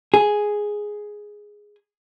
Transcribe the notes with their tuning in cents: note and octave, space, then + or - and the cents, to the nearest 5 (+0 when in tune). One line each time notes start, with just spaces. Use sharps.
G#4 +0